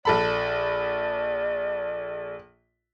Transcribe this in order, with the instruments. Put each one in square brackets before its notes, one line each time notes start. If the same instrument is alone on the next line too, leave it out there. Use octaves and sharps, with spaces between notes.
[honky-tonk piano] A#1 A4 B5 [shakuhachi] D5